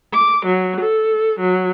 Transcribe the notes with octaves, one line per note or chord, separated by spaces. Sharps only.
D6
F#3
A4
F#3